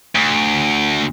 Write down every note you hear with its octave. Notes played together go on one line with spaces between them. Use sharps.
D2